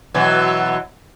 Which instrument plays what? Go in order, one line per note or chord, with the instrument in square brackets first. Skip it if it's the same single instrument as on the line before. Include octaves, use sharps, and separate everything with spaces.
[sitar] B2 E3 F#3